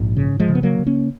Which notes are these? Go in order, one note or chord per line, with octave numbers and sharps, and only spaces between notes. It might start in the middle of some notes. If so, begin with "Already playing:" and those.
Already playing: A#1 G#2
C#3
F3 G#3
C#3
B3
F#3 A#3
C#3
A#3 C#4